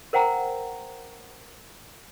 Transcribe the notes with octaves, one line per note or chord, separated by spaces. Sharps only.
A#4 C5 F#5 G5 A#5